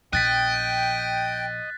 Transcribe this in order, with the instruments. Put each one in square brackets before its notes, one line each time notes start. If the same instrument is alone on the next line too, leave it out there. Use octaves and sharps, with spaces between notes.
[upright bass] A#1 B3 [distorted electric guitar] D#5 [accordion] G5 [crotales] F#6 A6 B6